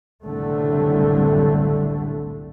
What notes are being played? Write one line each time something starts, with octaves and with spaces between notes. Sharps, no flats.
F#1 C2 A2 D3 A3